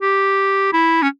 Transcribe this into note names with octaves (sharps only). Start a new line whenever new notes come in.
G4
E4
C#4